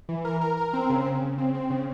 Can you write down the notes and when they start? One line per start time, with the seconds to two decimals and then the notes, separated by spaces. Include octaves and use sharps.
0.09 E3
0.25 A#4
0.41 A#4
0.57 A#4
0.73 C4
0.90 C#3
1.06 C#3
1.22 C#3
1.38 C4
1.54 C4
1.70 C#3